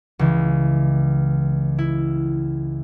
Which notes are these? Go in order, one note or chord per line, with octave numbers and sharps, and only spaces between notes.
C#2 E3
E4